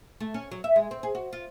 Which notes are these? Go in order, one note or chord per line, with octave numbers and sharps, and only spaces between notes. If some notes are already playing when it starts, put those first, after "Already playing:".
A3
C#4
F#3
E5
G#3
C4
G#4
F#4
F4